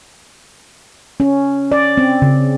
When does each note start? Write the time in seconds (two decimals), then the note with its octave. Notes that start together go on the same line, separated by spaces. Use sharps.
1.20 C#4
1.72 D5
1.98 C4
2.22 C#3